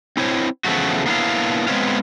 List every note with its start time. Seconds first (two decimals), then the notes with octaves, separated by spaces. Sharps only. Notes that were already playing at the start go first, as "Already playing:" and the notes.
0.17 C4 E4 C5 C#5
0.64 E2 C#3 F3 F#3 A3 F#4
1.06 A#3 B3 D4 E4 C#5 F5
1.68 G#3 B3 C4 B4 C#5 F5